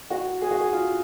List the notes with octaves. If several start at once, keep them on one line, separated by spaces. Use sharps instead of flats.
F#4
G#4
F#4
G#4
F4